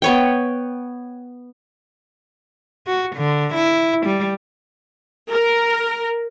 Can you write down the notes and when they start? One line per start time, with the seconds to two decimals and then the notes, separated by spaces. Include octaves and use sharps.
0.02 B3 C#5 G5
2.87 F#4
3.17 D3
3.54 E4
4.06 G3
5.32 A#4